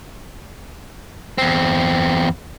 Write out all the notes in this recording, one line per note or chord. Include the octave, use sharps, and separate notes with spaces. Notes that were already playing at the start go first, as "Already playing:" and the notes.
E2 C4